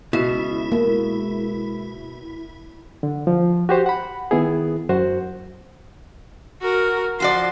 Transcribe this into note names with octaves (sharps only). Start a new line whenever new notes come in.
C#2 B2 E4
G#3 A#3
D3
F3
F#4 G4 C5
F#5 B5
D#3 B3 E4 G#4
F#2 F#4 C5
F#4 A#4
F3 F4 F#4 D5 C6